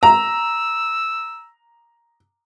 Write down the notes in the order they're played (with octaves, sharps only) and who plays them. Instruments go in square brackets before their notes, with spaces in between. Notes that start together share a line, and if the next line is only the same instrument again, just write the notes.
[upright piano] A#5 [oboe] E6